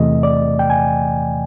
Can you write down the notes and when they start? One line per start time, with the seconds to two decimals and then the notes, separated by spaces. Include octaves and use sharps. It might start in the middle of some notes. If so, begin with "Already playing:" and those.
Already playing: E2 C3 E3 A3 D#5
0.23 D5
0.59 G5
0.70 G#5